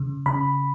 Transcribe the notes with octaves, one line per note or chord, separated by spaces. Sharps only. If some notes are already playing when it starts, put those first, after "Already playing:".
Already playing: C#3
C#3 B5